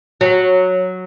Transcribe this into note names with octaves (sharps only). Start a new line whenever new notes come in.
F#3